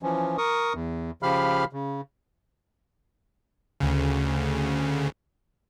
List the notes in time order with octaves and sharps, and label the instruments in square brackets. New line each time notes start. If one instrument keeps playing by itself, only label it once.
[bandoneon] E3 F3 C#4
A#4 C#6 D#6
E2
C#3 F3 G4 F5 B5 F6
C#3
[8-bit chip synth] D2 C#3